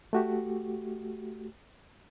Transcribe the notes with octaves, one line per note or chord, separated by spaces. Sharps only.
A3 F#4 G4